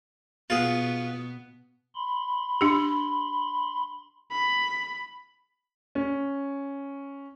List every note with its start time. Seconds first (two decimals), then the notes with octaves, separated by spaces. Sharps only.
0.50 B2 B3 F4 G#4
1.95 B5 C6
2.61 D4 G4
4.32 B5
5.95 C#4